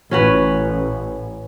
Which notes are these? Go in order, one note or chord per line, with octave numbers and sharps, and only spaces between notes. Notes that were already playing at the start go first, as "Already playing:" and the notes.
A1 C#4 F#4 B4